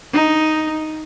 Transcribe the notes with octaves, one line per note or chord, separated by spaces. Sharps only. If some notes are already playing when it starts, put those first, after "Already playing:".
D#4